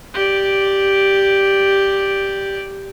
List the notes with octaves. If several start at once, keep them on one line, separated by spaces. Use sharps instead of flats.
G4 D5